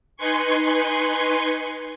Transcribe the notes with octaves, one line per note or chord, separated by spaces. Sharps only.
D#4 B4 G#5 C6 C#6